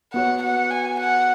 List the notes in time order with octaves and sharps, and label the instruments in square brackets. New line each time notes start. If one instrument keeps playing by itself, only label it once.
[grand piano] B3 F#4 C#5 [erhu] F#5
[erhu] F#5
G#5
F#5